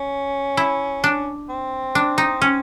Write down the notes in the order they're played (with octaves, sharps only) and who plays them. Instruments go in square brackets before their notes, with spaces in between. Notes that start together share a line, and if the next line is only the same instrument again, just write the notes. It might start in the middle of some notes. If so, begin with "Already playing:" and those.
Already playing: [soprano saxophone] C#4
[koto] E4
D4
[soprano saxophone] C4
[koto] D4
D#4
C#4